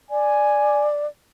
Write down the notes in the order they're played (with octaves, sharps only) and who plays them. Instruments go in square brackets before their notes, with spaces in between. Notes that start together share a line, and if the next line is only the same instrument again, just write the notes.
[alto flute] D5 [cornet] G#5